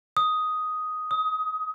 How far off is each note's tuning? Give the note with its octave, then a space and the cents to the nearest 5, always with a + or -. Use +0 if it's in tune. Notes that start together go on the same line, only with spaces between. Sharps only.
D#6 +5
D#6 +25